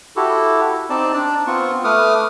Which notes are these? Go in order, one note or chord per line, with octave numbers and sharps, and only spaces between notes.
E4 F#4 G4 A4
C4 D#4 D5 A5
D4 D5
B3 C4 F4 C#6
A3 B4 D6 D#6 F6